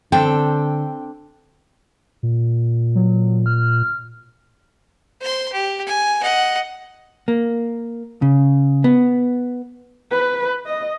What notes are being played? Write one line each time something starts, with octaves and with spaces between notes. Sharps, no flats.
D3 C4 D4 A4 G5
A#2
F#3
F6
C5 C6
G4
G#5
D#5 F#5
A#3
C#3
B3
B4
D#5